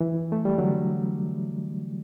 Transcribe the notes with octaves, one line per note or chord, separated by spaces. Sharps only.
E3
A3
G3
D3 F#3